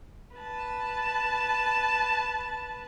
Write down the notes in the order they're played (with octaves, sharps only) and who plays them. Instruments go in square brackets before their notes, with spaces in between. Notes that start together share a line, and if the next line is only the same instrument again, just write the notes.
[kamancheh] B4 A5